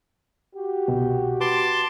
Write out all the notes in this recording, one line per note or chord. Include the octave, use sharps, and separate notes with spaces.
F#4 G4
C2 B2
B4 A5 C6 D6